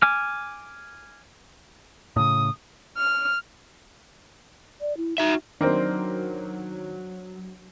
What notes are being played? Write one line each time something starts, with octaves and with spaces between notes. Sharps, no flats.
G#5 D6 F6
A2 C#3 D#6
F6
D5
E4
D#4 F#4 E5
D#3 F#3 A#3 C4 D4 C5